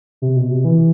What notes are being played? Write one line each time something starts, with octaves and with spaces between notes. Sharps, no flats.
C3
B2
C3
E3